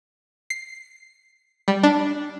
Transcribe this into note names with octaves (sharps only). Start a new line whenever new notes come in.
C7
G3
D4